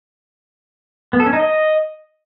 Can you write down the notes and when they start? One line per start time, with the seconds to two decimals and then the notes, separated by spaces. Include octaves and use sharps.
1.13 B3
1.20 A4
1.26 C#4
1.33 D#4
1.39 D#5